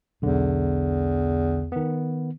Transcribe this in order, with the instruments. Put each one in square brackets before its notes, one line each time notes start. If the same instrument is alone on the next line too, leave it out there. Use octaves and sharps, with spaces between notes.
[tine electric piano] B1 D3 [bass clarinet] E2
[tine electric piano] D#3 B3